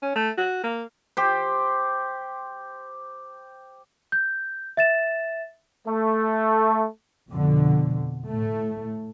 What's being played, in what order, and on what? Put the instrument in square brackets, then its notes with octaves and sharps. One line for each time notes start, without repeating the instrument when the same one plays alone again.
[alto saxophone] C#4
A3
F#4
A#3
[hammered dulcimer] G4 C5
[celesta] G6
E5 A6 E7
[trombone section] A3
[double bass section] F2 B2 D3
A2 A3